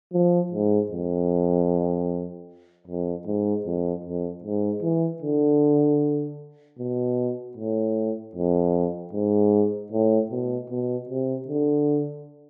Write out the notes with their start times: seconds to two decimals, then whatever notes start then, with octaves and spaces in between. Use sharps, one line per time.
0.13 F3
0.52 G#2
0.91 F2
2.87 F2
3.26 G#2
3.66 F2
4.04 F2
4.44 G#2
4.82 E3
5.22 D3
6.79 B2
7.57 A2
8.35 F2
9.13 G#2
9.92 A2
10.31 B2
10.70 B2
11.09 C3
11.48 D3